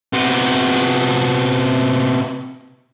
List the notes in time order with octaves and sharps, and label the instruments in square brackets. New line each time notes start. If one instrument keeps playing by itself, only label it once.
[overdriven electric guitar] C3 B3